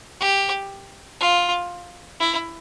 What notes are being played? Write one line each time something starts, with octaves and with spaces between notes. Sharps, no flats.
G4
F4
E4